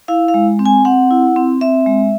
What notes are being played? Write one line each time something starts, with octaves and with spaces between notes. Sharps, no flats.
E4 F5
F5
G#3
C4
G#5
C4 F#5
E4
C4
C4 E5
G#3